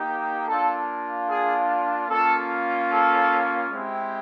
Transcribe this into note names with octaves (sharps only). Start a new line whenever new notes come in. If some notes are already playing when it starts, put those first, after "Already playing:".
Already playing: A#3 D#4 G4
A#3 D4 F4 A4
G#4
A#3 C#4 F4 A4
A4
G#3 C4 E4 G4